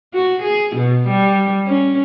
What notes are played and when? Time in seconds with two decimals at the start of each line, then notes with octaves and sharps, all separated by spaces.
0.14 F#4
0.43 G#4
0.76 B2
1.08 G3
1.67 C#4